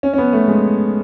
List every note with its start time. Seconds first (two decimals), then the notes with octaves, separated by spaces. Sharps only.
0.03 C#4
0.13 C#4
0.18 B3
0.33 A3
0.48 G#3